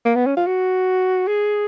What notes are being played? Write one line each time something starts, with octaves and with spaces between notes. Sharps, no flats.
A#3
B3
C#4
F4
F#4
G#4